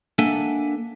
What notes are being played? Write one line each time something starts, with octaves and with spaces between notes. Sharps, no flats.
A#3 D4 A4 E5 F#5 G#5